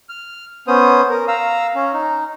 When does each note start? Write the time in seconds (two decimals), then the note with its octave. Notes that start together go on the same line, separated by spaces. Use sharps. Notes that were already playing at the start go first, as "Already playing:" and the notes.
0.09 F6
0.67 B3 C#4 C5 D#6
1.09 A#4
1.28 F5 A#5 E6
1.75 C#4
1.93 D#4